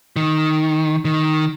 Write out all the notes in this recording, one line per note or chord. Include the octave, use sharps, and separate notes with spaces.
D#3
D#3